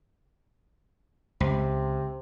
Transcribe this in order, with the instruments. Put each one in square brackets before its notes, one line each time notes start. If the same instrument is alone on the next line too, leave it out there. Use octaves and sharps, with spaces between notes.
[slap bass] C#2 [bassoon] C3